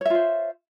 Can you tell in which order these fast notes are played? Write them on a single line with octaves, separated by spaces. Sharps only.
C#5 E5 F4 C5